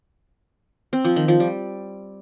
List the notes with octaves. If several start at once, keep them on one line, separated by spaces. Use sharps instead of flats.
C4
F3
D#3
F3
G3